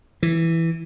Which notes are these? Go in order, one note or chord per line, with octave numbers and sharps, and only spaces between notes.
E3